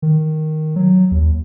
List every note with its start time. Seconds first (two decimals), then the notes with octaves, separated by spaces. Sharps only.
0.02 D#3
0.76 F#3
1.11 D#2